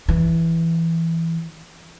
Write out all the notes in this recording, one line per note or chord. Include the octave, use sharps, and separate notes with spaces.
E3